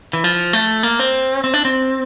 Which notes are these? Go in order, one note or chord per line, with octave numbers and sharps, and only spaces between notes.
E3
F3
A3
A#3
C4
C4
D4
C4